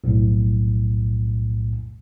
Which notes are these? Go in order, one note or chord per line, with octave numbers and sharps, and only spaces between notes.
B1 F2 A2